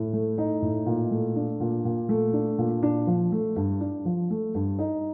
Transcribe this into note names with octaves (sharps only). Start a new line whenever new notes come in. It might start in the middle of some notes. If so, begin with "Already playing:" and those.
Already playing: A2
A3
D#4
A2
A#2
A3
D4
A#2
A#2
A3
D4
A#2
D4
F3
A3
G2
D4
F3
A3
G2
D#4